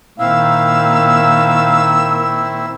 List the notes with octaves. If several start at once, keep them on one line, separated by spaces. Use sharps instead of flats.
A#2 D#3 C4 E4 F5 E6